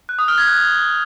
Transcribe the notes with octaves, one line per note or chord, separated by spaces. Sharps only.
F#6
D#6
F6
G#6
F#6